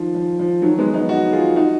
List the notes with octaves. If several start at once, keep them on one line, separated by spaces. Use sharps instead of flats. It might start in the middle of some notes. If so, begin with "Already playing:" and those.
Already playing: D#3 F3
F3
F3
D#3 F#3
G#3 B3
B3 D#4
D#4 F#4
F4 G#4
D#4 F#4